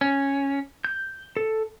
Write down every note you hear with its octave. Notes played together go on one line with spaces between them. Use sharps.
C#4
G6
A4